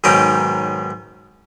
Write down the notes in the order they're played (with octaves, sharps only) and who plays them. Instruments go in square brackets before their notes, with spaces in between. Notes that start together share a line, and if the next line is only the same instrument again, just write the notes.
[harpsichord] B1 G#2 D#3 C#4 D#4 G5